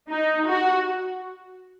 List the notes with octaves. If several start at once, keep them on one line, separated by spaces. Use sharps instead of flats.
D#4
F#4